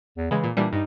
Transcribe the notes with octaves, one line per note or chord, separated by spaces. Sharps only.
E2
C#3 E3 G#3
A#2
A#2 E3 G3 D4
G2 D#4